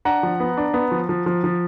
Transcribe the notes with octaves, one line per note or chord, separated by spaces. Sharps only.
D4 F#5 A#5
F3
B3
D4
B3
F3
F3
F3
F3